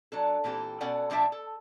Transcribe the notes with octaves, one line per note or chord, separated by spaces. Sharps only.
F#3 D4 A4
A#2 E3 C4 G4 A4
B2 C#4 A4 D5 F#5
A#2 F3 D4 D5 E5 A5
A4